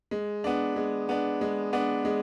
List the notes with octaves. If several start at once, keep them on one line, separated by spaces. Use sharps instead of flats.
G#3
B3 D4
G#3
B3 D4
G#3
B3 D4
G#3